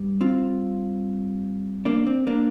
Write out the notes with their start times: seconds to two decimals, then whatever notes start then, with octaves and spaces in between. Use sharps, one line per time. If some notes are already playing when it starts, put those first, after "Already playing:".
Already playing: G2 G3
0.21 C4 F4
1.85 A#3 D4
2.06 C4
2.27 A#3 D4